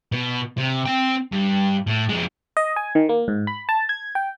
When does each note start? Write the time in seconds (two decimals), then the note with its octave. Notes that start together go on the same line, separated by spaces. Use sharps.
0.12 B2
0.58 C3
0.86 C4 G5
1.32 G2
1.87 A2
2.09 F2 G#3
2.57 D#5
2.76 G#5
2.95 D#3
3.09 A#3
3.28 G#2
3.47 B5
3.69 A5
3.89 G#6
4.15 G5